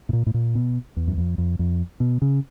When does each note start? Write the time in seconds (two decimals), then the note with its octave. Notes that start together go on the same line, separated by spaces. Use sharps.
0.09 A2
0.13 A#2
0.26 A2
0.34 A#2
0.55 B2
0.97 E2
1.08 F#2
1.18 F2
1.38 F2
1.59 F2
2.00 B2
2.22 C#3